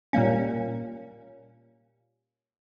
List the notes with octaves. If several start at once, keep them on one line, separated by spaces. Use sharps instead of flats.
A#2 G3 A#3 C#4